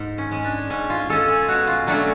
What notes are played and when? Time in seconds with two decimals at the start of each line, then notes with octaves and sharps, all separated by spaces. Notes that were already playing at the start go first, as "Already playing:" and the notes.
Already playing: G#2
0.18 C#4
0.31 G#3 C#4
0.44 D4
0.70 G#2 C#4
0.90 F4
1.09 G#3 C#4 A4
1.28 G#4
1.48 B2 F#4
1.67 F4
1.87 F#3 A3 C#4 D4